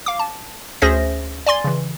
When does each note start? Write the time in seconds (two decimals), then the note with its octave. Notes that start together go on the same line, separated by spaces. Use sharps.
0.06 F5 D6
0.19 A5
0.82 D2 C#4 G#4 C5 E5 A#6
1.46 D5 G#5 C6 A6
1.64 C#3 E3